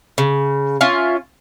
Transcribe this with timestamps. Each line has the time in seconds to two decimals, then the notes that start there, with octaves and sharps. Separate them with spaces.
0.18 C#3
0.81 C#4 F4 E5